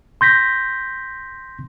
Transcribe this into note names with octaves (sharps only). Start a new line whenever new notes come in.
C6 G6 A#6 B6